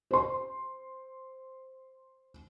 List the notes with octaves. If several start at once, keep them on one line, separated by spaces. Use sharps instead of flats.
C5 C6